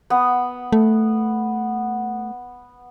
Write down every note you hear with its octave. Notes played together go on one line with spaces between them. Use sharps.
B3
A3